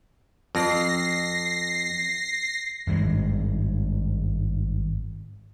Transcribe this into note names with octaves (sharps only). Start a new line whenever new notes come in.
F2 A#6 C7
G#1 G2 D3 G#3